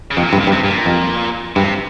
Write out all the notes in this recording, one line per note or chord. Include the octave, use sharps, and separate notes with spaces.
C#3
F2 C3
A#2
C3
G2
A#2
G2
C3
G2 A#2
F2
G2 C3